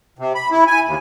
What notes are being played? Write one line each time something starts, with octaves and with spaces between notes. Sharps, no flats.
C3
B5
E4
G#5
D#2